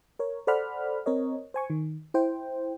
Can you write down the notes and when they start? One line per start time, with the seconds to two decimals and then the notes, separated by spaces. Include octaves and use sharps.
0.19 A#4 C#5
0.47 A4 C5 D5 F#5 B5 F6
1.06 C4 A#4 C#5 D#5
1.54 C5 G#5 C#6
1.70 D#3
2.14 E4 C5 G5